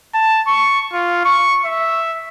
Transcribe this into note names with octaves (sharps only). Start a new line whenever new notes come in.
A5
C#6
F4
C#6
E5